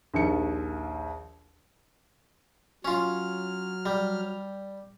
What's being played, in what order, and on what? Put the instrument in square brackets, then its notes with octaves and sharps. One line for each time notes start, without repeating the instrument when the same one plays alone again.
[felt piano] A#1 D#2 C#7
[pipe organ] F#3 F6 [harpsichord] C#4 F4
[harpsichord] G3